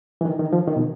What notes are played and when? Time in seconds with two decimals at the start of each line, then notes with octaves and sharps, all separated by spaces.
0.21 E3
0.25 D#3
0.39 D#3
0.53 F3
0.67 D#3
0.76 B2